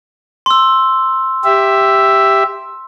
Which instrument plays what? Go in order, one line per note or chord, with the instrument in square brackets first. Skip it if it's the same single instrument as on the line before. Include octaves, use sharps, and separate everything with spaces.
[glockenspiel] C6 E6
[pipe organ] G4 E5